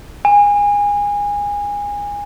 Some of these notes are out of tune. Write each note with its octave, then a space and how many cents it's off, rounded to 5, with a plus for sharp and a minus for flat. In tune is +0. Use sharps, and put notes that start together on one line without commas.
G#5 -25